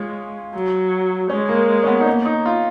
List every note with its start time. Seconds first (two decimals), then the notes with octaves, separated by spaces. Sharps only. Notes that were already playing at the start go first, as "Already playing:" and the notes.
Already playing: G#3 C#4 F4
0.54 F#3
1.30 G#3 C#4
1.49 A#3
1.83 C#4
1.87 B3
2.00 D#4
2.06 A#3 C#4
2.25 D#4
2.46 F4